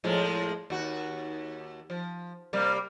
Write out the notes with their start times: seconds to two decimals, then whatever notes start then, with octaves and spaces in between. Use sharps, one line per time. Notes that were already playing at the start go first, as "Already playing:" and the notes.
0.04 A2 F3 G#3
0.70 D#2 F#4
1.90 F3
2.53 C3 G3 A#3